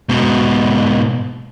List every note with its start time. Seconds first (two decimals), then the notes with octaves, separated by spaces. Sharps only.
0.09 G#2 B2